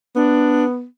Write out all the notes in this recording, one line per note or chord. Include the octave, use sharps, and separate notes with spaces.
B3 D4